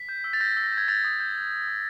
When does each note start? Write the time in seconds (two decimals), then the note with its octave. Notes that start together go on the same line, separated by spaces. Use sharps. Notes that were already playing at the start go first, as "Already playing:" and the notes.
Already playing: B6
0.09 G6
0.24 E6
0.33 A6
0.40 G6 A#6
0.57 E6
0.64 A#6
0.72 G6
0.78 G#6
0.88 G6 A6
1.04 D#6
1.20 G6
1.36 G6
1.52 G6
1.68 D#6